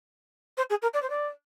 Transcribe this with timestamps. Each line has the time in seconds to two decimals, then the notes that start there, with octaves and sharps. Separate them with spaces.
0.57 C5
0.70 G#4
0.82 A#4
0.94 D5
1.03 C5
1.10 D5